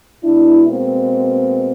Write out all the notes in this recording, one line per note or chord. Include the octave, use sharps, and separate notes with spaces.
B2 G#3 D4 E4
A#3 C4